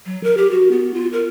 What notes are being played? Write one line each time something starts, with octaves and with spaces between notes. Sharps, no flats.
F#3
A#4
G4
F#4
B3
F4
A#4